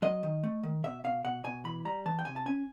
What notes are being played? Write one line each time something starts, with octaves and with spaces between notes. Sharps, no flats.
F#3 D#5
D#3
A3
D#3
B2 E5
B2 F5
B2 F#5
B2 G#5
E3 B5
G3 A#5
E3 A5
G5
C3 G#5
A5
C#4 G#5